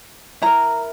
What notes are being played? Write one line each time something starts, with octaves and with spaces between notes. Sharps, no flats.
E4 A#4 A#5